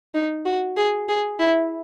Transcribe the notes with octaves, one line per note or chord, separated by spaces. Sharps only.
D#4
F#4
G#4
G#4
E4